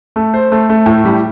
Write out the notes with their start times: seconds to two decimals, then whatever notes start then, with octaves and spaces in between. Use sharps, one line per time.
0.16 A3
0.34 C5
0.52 A3
0.69 A3
0.86 A2
1.05 G3